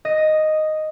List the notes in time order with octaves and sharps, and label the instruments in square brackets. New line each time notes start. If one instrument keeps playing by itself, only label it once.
[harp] D#5